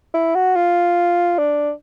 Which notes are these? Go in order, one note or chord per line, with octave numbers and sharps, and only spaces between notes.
E4
F#4
F4
D4